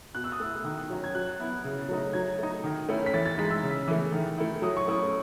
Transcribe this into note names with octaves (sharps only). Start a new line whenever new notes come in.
B2 F#6
E6
D#6
A3 E4 E6
D#3
F#3 C#4
G#6
F#3 F#6
B3 E4
C#3
F#3 A3 D#4
F#3 G#6
A3 D#4
D#3
A3 C#4 E4
B6
E3 A6
A6
G#3 D#4 B6
E6
C#3
E3 A3
D#3
A3 E4
F#3 D#6
C#6
A3 C#4 E4 D#6